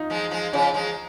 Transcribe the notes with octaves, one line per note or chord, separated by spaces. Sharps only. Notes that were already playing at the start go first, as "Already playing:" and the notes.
Already playing: D#4 F4
F3 G#3
F3 G#3
C#3 F3
F3 G#3